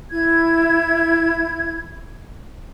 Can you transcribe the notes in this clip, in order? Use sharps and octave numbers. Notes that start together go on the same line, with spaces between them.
E4 G#6